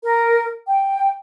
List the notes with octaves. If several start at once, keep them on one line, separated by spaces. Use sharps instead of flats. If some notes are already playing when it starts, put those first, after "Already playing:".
A#4
G5